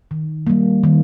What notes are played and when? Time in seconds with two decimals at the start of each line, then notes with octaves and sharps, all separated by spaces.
0.11 D#3
0.47 G3 A#3
0.84 D#3